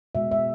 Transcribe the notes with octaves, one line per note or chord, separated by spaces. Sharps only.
B2 G#3 E5
E5